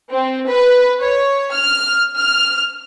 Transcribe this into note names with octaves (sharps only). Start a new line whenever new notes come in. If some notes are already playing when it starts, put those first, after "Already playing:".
C4
B4
C#5
F6
F6